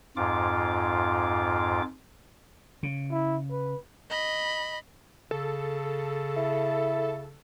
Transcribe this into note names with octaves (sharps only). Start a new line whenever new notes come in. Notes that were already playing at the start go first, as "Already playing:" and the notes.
F2 G#2 F4 D6
C#3
E4
B4
D#5 B5
C#3 A4
E4